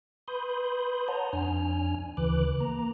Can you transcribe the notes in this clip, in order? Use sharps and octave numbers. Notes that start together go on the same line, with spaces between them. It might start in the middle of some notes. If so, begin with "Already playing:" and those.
B4 B5 C6 D#6 G6
C#5 F#5 A5 A#5
F2 D4 G#5 F6
D2 C#3 E3 B4 D6 F#6
A#3 A#5